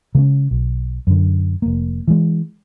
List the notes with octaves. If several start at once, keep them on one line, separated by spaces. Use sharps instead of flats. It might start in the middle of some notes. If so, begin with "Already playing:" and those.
C#3 G#3 B3 C#4
B1
F#2 D3
F1 A#3
E3 G#3